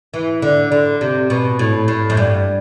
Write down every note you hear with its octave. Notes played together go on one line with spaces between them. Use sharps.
E3
D3
D3
C3
B2
A2
A2
F#2
G2